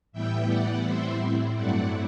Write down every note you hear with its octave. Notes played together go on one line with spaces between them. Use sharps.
A2 E3 G3 B3 E4 E5 G5
D5 F#5
A2 G3 C4 E4 C5 E5
G2 F#3 A3 C4 E4 D5 F#5